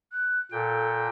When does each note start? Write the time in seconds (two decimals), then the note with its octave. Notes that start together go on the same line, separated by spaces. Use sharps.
0.12 F#6
0.52 A#2 A4 G5